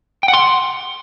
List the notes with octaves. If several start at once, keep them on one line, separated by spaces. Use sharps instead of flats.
G5
F#5
C6